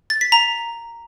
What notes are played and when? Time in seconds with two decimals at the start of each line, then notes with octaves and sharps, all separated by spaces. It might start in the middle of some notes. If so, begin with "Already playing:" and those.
0.10 A6
0.21 B6
0.32 A#5